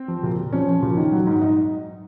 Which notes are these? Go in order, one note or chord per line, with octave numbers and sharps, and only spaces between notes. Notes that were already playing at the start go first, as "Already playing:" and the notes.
Already playing: C4
F3
A#2
A#2
F3 C#4
F3
A#2
D#3
F#3
G#2
D#4